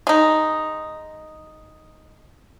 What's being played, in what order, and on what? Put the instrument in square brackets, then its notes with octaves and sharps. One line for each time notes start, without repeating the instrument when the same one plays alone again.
[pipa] G#3 D#4